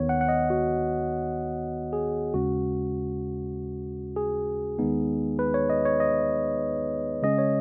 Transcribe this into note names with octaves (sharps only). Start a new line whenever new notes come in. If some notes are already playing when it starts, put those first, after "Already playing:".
Already playing: D#2 D#3 B3 C#5
F#5
F#5
D#5
F#4
G#4
D#2 C#3 G#3 C#4 F#4
G#4
D#2 D#3 G#3 B3 D#4
B4
C#5
D#5
C#5
D#5
C#3 G#3 C#4 D#5
C#5